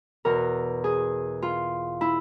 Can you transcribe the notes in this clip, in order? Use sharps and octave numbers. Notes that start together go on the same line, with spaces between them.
E2 B2 A#4
G#4
F4
E4